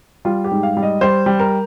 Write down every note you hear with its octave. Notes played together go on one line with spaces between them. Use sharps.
G3 F4
G4
G#2
F5
G3
D#5
G3 C5
G3
A#4